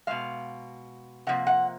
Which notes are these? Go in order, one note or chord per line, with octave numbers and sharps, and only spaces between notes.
B2 G#3 F5
C3 F3 A#3 F#5
F#5